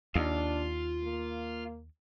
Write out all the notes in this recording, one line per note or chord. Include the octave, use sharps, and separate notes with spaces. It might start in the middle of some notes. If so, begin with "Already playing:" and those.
D#2 D4 F4
A#3